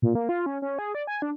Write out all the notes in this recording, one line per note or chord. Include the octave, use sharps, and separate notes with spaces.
A#2
A#3
F4
C#4
C#4
G#4
D5
G#5
D4